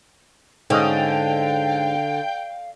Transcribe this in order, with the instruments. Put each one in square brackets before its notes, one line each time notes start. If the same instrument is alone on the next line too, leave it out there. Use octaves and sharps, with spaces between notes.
[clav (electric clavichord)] G#2 C#4 D#5 [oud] D3 [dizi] F5 [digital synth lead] G5